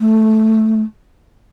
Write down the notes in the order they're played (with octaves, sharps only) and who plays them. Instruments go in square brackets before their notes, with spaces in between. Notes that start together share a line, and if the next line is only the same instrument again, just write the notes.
[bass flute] A3